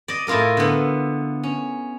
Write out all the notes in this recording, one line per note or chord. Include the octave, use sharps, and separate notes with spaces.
D5 D#5
A2 E4 F4 A#4 D#5
D3 B3
C#4